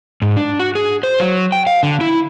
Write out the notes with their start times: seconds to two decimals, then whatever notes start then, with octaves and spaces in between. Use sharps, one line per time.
0.22 G#2
0.37 D4
0.59 F#4
0.75 G#4
1.03 C5
1.20 F#3
1.52 G5
1.67 F5
1.83 D3
2.01 E4